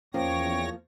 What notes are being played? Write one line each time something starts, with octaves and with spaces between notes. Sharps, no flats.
E2 F3 A#3 C#4 C#5 G5 A#6